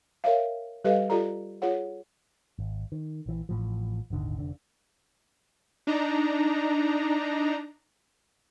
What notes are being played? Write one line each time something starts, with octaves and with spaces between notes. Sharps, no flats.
A#4 C#5 E5 F5
G3 G4 A4 B4 D#5 F5
F4 G4 A4 D5 A#5
F4 G#4 C#5 F#5
G#1
D#3
A#1 E3
A1 A2 F3
D#1 G#1 D3 D#3
F1 D3
D4 D#4 A#5